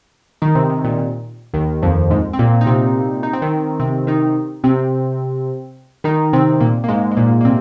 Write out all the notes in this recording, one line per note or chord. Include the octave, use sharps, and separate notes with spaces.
D#3 D#4
C3 C4
C3
A#2
D#2 D#3
F2 F3
G#2 G#3
C4
A#2 A#3
D#4
C3 C4
D#4
C4
D#3 D#4
C3 C4
D#3 D#4
C3 C4
D#3 D#4
C3 C4
A#2 A#3
A#3
G#2 G#3
G#3
A#2 A#3
A#3
C3 C4